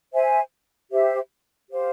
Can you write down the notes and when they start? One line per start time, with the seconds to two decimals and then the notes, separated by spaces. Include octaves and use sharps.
0.13 C5 E5 G#5
0.91 G4 C5 E5
1.69 G4 C5 F5